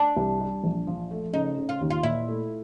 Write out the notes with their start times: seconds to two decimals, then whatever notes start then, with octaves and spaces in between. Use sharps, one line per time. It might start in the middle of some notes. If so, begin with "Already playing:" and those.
Already playing: D4
0.17 C2
0.40 G3
0.64 A#1
0.87 F3
1.11 A3
1.33 C#3 D#4
1.57 C#3
1.69 F4
1.81 D#2
1.90 F4
2.03 A#2 E4
2.28 A3